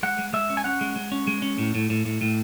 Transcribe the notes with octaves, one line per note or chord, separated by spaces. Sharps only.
G#3 F#5
G#3
G#3 E5
C#4
G#5
C#4 F#5
G#3
G#3
C#4
G#3
C#4
A2
A2
A2
A2
A2